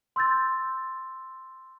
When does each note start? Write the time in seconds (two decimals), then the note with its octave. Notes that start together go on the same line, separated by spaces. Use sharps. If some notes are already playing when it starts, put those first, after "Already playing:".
0.16 C6 E6 G6 A6